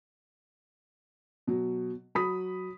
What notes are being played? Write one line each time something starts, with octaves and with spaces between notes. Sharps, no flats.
B2 F#3
F#3 B5 D#6 B6